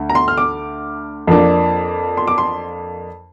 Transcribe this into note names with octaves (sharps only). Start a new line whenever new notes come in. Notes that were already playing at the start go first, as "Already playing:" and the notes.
Already playing: D2 D3
A#5
C6
F6
D6
F2 F3 A#3 D4
C6
D6
C6